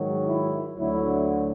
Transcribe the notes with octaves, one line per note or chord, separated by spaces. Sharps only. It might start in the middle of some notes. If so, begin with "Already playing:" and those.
Already playing: G#2 D#3 F#3
E4
D2 D3 F#3 E4